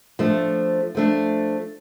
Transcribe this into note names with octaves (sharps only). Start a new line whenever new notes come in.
F3 A3 D4
F3 A3 D4